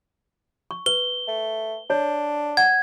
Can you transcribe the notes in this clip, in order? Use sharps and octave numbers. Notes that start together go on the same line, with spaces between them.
C#6
B4 G7
A3
D4 C#5
F#5 G#6